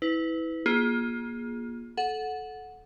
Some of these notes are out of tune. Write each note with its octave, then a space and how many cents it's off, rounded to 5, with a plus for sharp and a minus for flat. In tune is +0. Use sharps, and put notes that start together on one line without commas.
E4 -25 B4 +20
A#3 +30 F4 +20 G#4 +0
A4 -20 F#5 -10